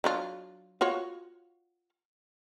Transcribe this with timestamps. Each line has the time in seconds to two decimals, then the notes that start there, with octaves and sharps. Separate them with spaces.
0.04 F#3 D4 F4
0.81 F4 F#4 C#5